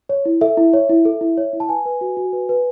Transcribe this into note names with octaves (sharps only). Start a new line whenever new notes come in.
C#5
E4
A4 E5
E4
C#5
E4
A4
E4
C#5
E4
A5
B4 G#5
B4
F#4
F#4
B4
B4